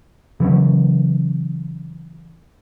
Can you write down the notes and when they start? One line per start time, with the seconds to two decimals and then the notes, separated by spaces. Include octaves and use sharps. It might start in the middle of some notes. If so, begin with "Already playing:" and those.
0.40 C#3 E3 F#3 C#4